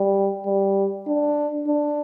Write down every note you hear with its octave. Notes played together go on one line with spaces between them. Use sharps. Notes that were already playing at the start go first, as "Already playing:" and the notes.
Already playing: G3
G3
D4
D4